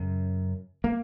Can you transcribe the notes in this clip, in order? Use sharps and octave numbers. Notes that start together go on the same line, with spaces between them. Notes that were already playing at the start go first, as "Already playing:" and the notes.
Already playing: F#2 C#3
A#3